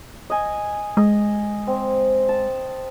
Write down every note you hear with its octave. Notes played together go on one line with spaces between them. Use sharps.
D#5 G#5
G#3 D#5
C4
A5